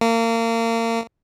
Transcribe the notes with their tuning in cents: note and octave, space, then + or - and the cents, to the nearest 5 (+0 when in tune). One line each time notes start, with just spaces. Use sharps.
A#3 -30